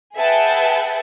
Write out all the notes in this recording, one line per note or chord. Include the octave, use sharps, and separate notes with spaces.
G#4 B4 E5 F#5 G5 A5